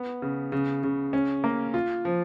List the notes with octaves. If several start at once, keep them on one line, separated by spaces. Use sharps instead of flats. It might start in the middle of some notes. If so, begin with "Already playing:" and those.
Already playing: B3
C#3
C#3
C#3
C#4
A#3
F4
F3